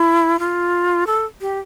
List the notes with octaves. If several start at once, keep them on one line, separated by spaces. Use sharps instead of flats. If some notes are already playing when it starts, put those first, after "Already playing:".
Already playing: E4
F4
A4
G4